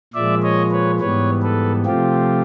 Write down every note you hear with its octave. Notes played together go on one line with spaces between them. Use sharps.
A#2 F3 G#3 D5 E5
C#5 D#5
B4 C#5
G#2 E3 G3 B3 B4 C#5
A4 B4
C3 F3 A3 C4 F4 G4